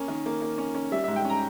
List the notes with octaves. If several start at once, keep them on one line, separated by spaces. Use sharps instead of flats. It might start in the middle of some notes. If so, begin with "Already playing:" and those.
Already playing: A#3 C#4
D#3
A#3
A#3
C#4
C#4
G3 E5
G#2 E5
G5
C#4 A#5